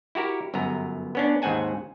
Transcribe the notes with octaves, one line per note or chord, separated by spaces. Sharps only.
E4 F#4 G4 A#4
G1 F#2 B3 A#5
B3 C#4 D4
D#2 G#2 C4 F#5 G#5 A5